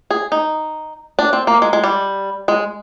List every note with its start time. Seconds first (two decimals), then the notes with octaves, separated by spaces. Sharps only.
0.11 G#4
0.32 D#4
1.19 D4
1.33 C4
1.47 A#3
1.62 G#3
1.73 G#3
1.84 G3
2.48 G#3